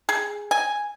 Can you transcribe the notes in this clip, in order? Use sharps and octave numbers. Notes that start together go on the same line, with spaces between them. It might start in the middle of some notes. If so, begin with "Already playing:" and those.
G#4
G#5